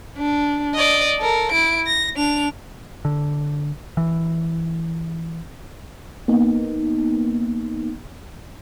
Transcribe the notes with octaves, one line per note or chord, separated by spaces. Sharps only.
D4
D5 D#5
A4 A#4
E4 D7
A#6
D4 F7
D3
E3
A#3 B3 D#4